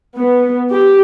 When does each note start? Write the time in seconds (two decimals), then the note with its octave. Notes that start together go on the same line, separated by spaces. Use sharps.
0.17 B3
0.72 G4